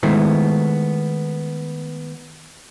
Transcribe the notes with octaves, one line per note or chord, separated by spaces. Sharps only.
D#3 G#3 A3 B3 E4 C5